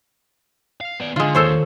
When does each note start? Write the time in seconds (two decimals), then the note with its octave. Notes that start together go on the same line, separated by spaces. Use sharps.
0.81 F5
1.00 B3 D5
1.16 D3 G#3 F4
1.35 D#2 A4 C5 C#5